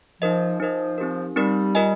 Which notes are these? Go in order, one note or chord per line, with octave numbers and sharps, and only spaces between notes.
F3 D#4 A#4 D#5
F3 D#4 A#4 D#5
C4 D#4 G4 A#4
G3 C4 D#4 G4 A#4
F4 A#4 D#5 G#5